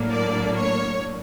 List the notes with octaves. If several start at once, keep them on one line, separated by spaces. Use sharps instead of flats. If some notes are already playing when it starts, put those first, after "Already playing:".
Already playing: A2 F#3 A#3 D4
D5
C#5